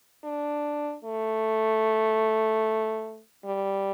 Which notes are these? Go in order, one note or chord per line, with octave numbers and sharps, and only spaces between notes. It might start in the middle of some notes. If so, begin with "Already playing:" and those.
D4
A3
G3